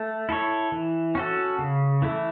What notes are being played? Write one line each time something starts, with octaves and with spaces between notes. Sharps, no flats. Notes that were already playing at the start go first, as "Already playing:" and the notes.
Already playing: A3
E4 A4 C#5
E3
C#4 F#4 A4
C#3
E3 A3 E4